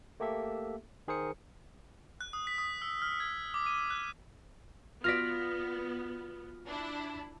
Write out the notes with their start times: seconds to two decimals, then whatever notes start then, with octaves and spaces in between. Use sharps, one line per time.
0.20 A3 A#3 G4 A4 E5
1.08 D#3 G#4 A#4 C5 D#6 C#7
2.21 F#6
2.33 D#6
2.47 B6
2.58 D#6
2.82 E6
3.02 F6
3.20 G#6
3.54 D6
3.66 D#7
3.90 F#6
5.04 B3 F4 F#4 D5 F6 A#6 B6
6.67 D4 E4